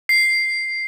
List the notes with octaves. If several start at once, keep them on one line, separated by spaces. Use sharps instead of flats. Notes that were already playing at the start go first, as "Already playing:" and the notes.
C7